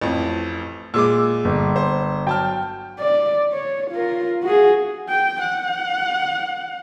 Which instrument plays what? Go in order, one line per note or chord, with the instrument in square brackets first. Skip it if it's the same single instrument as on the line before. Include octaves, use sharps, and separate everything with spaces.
[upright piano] A1 F2
[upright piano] A#2 G#3 D6 [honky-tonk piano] E6
[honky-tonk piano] G1
[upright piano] C5
[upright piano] F#3 A5 F6 [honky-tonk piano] G5
[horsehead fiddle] D5
C#5
F4 A#4
F#4 G#4
G5
F#5